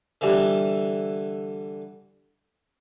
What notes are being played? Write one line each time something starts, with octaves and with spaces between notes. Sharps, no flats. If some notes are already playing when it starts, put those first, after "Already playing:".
D3 E3 G3